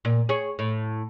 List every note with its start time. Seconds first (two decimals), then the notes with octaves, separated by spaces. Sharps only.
0.05 A#2
0.29 G#4 C#5
0.59 A2